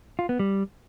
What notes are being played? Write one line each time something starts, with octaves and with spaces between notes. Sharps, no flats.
F4
B3
G3